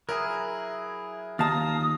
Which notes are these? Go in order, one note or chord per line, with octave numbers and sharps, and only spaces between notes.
F#3 E4 G#4 A#4
D#2 F4 F5 A5 A#5 D#6